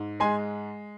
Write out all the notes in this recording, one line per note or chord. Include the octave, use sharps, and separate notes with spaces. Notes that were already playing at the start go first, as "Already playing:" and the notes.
Already playing: G#2
G#3 G#5 C6